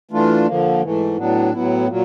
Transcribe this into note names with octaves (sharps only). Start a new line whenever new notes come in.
E3 A3 D4 F4
D3 F3 A#3
G#2 E3 A3
A2 F#3 B3 D4
A2 F#3 B3 E4
A#2 F#3